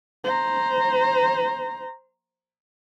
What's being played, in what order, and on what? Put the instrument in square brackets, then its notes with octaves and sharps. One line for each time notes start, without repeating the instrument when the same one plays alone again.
[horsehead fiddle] C5 A#5